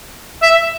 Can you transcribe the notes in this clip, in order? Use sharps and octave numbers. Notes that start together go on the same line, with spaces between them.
E5